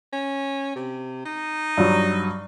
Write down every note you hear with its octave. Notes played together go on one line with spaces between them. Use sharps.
C#4
C3
D#4
G2 F#3